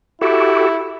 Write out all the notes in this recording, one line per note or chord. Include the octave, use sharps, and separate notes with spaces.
E4 F#4 G4 A4